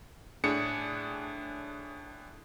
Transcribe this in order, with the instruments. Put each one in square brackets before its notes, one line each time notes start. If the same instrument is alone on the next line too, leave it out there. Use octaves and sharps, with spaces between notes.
[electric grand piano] A2 D4 G#4 C#7